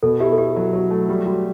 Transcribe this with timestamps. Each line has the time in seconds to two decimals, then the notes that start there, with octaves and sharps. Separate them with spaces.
0.03 B2 A4
0.20 E4 G4
0.32 A4
0.38 E4 G4
0.56 F#3
0.73 F#3
0.91 A3
1.09 G3 G4
1.26 G3 F#4